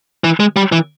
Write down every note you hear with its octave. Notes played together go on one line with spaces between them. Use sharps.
E3
G#3
G3
E3